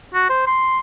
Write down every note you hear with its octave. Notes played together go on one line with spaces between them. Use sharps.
F#4
C5
C6